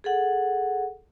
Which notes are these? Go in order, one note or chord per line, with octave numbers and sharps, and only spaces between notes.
G#4 A4 F#5